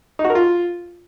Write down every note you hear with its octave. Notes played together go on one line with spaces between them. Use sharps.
D#4
F#4
A#4
F4